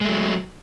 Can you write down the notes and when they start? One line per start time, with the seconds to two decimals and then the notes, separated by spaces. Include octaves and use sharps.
0.01 G#3
0.05 A3
0.09 F#3